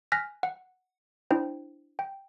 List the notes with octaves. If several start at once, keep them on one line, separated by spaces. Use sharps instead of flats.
G#5 F6 F#6 A#6 B6
F#5
D4 E4 C5 G5
G5